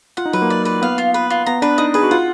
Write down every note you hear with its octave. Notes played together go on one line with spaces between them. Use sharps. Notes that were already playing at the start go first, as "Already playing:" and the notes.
F4 F#5
D#4
F#3 B4
A#3
D5
B4
B3 F5
F4
B4
F4
B3 A#5
D4 B4
D#4 D#5
G#4 B4
F#4
F4 F#5